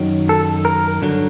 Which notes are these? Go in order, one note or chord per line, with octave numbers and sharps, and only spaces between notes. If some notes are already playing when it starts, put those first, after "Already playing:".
Already playing: F#2 D#3 F#3
A4
A#4
G2 D3 F#3